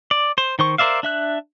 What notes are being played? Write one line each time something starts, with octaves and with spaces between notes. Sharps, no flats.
D5
C5
D#3 C5 C#6
A#4 C5 D5 E5 F5
D4 E5 F#6